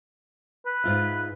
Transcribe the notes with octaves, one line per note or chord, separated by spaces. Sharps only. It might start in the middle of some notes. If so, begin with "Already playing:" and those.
B4
G#2 F4 E5